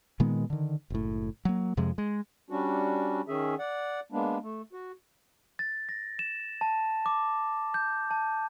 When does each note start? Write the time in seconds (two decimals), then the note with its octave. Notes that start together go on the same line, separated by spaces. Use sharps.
0.20 A#2 D#3 G#3 B3
0.50 D3 D#3
0.90 F#1 A2
1.45 F#3 A#3
1.77 F2 C3 F3 G#3
1.98 G#3
2.50 G3 C#4 D4 F#4
3.28 D#3 C#4 G#4 E5
3.59 D5 F#5
4.12 G#3 A#3 B3 D4
4.42 A3
4.73 F#4
5.59 A6
5.89 A#6
6.19 E7
6.61 A5
7.06 D6
7.74 G6
8.11 A5